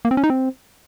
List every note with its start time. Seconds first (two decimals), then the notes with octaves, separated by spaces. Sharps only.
0.05 A#3
0.11 C4
0.17 C#4
0.24 D#4
0.30 C4